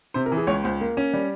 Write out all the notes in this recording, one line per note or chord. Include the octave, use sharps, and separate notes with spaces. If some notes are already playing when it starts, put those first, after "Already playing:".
C3 C5
A#4
E3
G#4
C#2 C#5
C#2 C5
A#3
C#4
G3